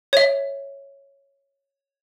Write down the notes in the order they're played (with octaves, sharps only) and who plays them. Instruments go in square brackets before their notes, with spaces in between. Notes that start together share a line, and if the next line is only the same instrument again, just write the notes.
[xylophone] C#5 E5